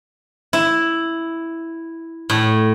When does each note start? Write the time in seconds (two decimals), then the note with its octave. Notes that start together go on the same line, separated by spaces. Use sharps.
0.53 E4
2.30 A2